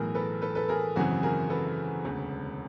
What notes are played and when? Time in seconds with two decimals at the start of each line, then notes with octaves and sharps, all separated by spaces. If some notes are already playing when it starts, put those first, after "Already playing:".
Already playing: B1 A2 E3 G#4 A#4
0.15 A4 B4
0.42 A4 B4
0.55 A4 B4
0.69 G#4 A#4
0.96 G#1 F#2 C#3 E3 F#4 G#4
1.23 G#4 A#4
1.50 A4 B4
2.04 E1 D2 C#3